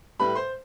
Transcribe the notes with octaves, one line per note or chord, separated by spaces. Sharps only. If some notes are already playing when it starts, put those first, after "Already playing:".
A2 G3 B4 B5
C5 C6